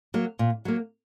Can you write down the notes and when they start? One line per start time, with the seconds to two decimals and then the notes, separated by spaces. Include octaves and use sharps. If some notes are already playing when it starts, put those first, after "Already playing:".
0.14 F#3 A#3
0.39 A#2
0.65 F#3 A#3